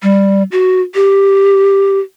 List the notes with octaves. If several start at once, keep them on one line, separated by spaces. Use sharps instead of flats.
G3
F#4
G4